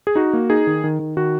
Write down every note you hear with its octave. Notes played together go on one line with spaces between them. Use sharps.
G#4
D#4 F#4
A#3
D#4 G#4
D#3
D#3
D#3
D#3 F#4